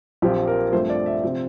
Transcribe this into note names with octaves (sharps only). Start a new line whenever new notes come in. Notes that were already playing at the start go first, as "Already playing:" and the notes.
A#1 A#2 F3 C4 G4
A#4
G2 F3 A3 C4 C5
D5
E5
C3 F3 C4